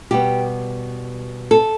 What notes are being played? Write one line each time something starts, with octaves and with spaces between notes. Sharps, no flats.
B2 G3 B3 G4
A4